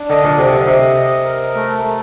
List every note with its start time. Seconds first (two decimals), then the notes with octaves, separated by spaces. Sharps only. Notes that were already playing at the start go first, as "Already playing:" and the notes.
Already playing: D4
0.10 D3 D#5
0.24 A#2
0.38 C3 D#5
0.53 D3
0.68 C3 D#5
0.97 D#5
1.25 A#4
1.55 A3
1.83 A3